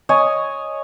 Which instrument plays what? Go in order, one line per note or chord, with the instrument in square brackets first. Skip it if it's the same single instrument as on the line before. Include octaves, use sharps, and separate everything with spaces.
[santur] C#5 D#5 G#5 D#6